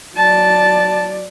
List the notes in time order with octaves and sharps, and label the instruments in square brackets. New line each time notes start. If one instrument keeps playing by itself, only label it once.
[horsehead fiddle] F#3 D5 [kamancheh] A5